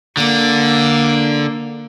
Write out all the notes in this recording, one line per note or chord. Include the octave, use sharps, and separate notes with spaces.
D3 A#3